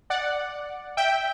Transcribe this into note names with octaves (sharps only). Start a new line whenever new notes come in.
D5 F#5
E5 G5